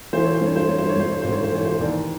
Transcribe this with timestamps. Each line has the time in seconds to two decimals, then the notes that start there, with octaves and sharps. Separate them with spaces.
0.13 E3 C5
0.24 C#5
0.34 C5
0.41 G2
0.46 C#5
0.56 C5
0.67 G2 C#5
0.78 C5
0.89 C#5
0.96 G2 C5
1.11 C#5
1.22 G#1 C5
1.32 C#5
1.43 C5
1.52 E3 C#5
1.65 C5
1.79 D#2 D5